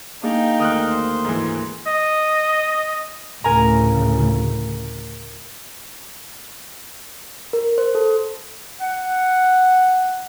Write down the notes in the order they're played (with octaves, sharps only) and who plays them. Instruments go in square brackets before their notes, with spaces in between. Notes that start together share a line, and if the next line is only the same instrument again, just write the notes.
[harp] A#3 D4 G#4 [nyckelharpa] D#4 G5
[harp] D2 D#3 [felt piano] D#6 F6 F#6
[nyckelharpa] C5
[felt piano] G#2 E3
[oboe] D#5
[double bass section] D2 A2 C#3 [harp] A#4 G#5 A#5
[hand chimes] A#4
C5
A4
[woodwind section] F#5